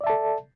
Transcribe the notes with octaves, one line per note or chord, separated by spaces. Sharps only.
A4 D5 E5 A5